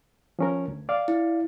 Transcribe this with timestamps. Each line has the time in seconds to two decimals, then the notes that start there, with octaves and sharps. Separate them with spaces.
0.39 F3 C#4 A#4
0.68 D2
0.89 D5 F5
1.08 E4